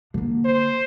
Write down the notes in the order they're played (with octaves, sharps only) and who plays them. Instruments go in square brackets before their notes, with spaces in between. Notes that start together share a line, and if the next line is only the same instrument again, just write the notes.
[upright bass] D3 A#3
[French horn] C5